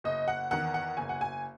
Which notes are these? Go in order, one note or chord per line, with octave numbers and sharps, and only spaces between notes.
F#1 D#5
F#5
E2 D#3 F#5
F#5
F#1 G#5
F#5
G#5